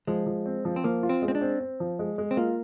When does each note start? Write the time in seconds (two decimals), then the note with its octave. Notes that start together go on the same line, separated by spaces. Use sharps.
0.07 F3 G#3
0.27 F3
0.46 C4
0.65 F3
0.76 C4
0.84 F3 A#3
1.03 F4
1.09 C4
1.22 G#3
1.28 C4
1.35 D4
1.41 C4
1.61 C4
1.80 F3
1.99 G#3
2.18 G#3
2.31 C4
2.37 A#3 F4